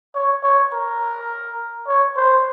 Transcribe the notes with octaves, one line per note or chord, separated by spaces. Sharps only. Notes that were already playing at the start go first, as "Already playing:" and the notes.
C#5
C#5
A#4
C#5
C5